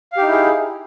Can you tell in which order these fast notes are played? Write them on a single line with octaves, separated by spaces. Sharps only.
F5 G4 D#4 E4 G#4